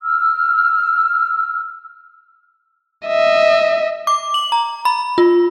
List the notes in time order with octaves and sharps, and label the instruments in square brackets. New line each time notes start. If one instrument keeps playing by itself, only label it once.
[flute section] E6 F6
[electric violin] D#5 E5
[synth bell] D6
F#7
A#5
B5
F4